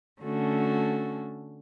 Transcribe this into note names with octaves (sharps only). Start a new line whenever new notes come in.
D3 A3 C#4 F#4